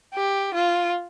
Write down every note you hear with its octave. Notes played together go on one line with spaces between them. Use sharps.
G4
F4